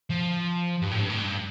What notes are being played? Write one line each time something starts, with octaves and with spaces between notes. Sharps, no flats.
F3
G2
A2
G2
A2
G2